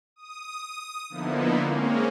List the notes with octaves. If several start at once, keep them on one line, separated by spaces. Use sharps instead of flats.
D#6
D3 F3 A#3 B3 D#4 E4
G#3 A#3 C4 C#4